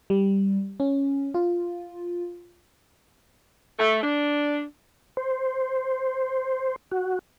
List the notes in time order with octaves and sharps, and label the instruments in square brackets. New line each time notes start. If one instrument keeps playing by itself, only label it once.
[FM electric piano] G3
C#4
F4
[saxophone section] A3
D4
[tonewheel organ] C5
F#4